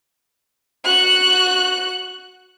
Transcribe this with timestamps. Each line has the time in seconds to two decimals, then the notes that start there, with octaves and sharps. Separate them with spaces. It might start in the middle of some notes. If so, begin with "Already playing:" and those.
0.85 F#4 F#6